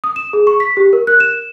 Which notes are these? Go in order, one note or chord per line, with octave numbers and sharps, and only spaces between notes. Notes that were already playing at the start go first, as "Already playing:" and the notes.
D#6
E7
G#4
C#6
B6
G4
A#4
F#6
E7